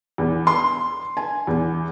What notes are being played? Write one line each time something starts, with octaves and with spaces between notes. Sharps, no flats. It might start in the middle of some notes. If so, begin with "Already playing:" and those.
E2
C6
G#5
E2